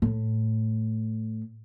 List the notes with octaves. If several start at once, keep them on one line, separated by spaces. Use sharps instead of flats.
A2